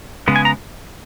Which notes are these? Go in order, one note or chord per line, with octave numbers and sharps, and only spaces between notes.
C#3 G#3 B3
G#5
A#5